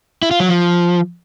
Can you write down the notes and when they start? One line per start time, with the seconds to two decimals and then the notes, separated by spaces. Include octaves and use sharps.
0.22 E4
0.31 F4
0.40 F#3
0.49 F3